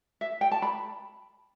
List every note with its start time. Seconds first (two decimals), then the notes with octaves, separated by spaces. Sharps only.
0.21 E5
0.41 G5
0.51 A5
0.62 B5